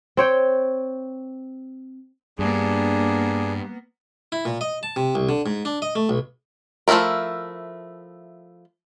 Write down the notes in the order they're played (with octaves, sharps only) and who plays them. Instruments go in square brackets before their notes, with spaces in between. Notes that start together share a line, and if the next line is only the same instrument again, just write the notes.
[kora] C4 C#5 G5
[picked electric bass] G2 [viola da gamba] A#3 B3 [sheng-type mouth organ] D4 G#4
[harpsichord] E4
A#2
D#5
A5
C3
C2
D3
G#2
D4
D#5
A3
B1
[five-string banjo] F3 A3 C4 E4 A#4